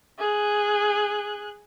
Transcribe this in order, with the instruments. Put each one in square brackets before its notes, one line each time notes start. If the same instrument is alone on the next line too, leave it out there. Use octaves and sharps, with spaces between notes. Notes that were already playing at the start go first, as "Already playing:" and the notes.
[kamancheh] G#4 F#6